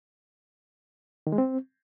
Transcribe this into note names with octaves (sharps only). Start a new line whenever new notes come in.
D#3
G#3
C4